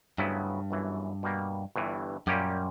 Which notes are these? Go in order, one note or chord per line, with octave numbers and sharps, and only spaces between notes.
D2 G2 C#3 F#3 B3 E4
G1 F#2 E3
B2 G3 A#3
G1 G2 E3
F#2 A#2 G3 A#3 C#4 G4